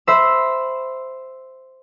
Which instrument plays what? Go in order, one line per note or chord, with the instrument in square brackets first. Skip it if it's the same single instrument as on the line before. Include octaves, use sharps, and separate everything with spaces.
[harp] C5 E5 B5 E6